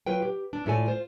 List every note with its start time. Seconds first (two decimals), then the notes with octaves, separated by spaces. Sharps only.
0.06 F#3 F4 B4 G5
0.22 G4
0.53 D4
0.66 A2 A3 F4 A4 D5 G#5
0.86 F4 C5